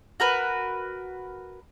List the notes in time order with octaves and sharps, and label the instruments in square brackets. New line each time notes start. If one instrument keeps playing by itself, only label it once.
[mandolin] F#4 A#4 B4